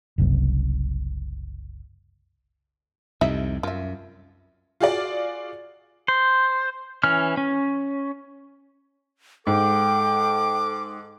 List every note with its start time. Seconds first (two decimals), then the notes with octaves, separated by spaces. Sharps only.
0.18 F#1 C2 F#2
3.21 C2 F2 C3 D#4 E5
3.63 F#2 F4 E5
4.80 F4 F#4 G#4 D5
6.08 C5
7.03 E3 C#4 F6
7.37 C#4
9.47 G#2 A4 G5 D6